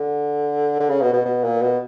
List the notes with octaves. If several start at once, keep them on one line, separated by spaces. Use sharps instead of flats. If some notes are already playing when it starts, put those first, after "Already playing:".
Already playing: D3
D3
C#3
B2
B2
B2
A#2
B2